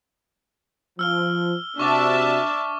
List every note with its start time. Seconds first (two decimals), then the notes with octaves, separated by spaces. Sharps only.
0.99 F3 E6 F6 G7
1.79 C3 D4 F#4 E5 A5 C#6 D6 A6